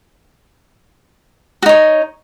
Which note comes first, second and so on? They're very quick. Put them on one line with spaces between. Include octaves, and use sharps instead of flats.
F#4 D#4 C#5